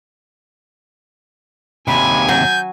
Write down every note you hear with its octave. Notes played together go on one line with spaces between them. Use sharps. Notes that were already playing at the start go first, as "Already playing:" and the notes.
D#2 C3 G#5 B5 G#6
F#3 G6